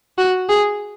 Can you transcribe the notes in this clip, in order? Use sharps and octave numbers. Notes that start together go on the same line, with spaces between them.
F#4
G#4